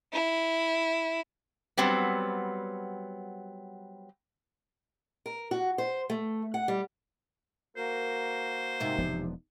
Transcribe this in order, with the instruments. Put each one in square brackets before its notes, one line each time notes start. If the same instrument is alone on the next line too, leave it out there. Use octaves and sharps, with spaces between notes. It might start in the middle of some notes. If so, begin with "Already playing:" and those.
[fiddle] E4
[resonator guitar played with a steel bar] F#3 G3 B3 C4
[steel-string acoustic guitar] A#4
F#4
C5
A3
F#5
G3
[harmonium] A#3 F#4 A#4 [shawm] C5
[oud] G#2 C3 E5
[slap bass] E1 F3 B3